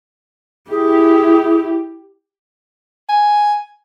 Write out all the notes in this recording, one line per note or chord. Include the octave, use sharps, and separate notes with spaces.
E4 G4 G#4
G#5